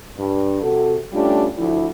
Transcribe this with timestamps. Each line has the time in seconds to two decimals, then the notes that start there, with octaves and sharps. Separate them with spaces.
0.17 G2
0.62 C3 F#4 A4
1.12 G3 A3 C#4 D4 F4 G4
1.58 D2 F3 E4